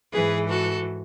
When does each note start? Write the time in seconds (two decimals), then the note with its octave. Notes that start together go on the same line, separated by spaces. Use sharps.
0.13 G#2 E3 G#4 B4
0.49 F#4 A4